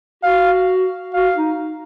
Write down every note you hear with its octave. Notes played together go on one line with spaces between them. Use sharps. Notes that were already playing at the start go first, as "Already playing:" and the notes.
F#4 F5
F#4 F5
D#4